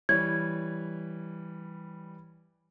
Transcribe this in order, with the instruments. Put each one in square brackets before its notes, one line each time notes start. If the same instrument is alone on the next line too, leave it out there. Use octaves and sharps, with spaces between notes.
[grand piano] E3 G3 C#5 [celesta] G#6